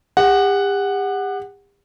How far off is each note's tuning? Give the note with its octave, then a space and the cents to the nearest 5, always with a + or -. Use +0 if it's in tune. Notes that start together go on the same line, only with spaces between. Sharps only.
G4 +40 F#5 +0